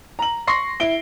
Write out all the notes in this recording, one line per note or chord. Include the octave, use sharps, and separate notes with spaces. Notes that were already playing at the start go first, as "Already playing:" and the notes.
A#5 F#7
C6 C#6 A#6 C7
E4 D7 G7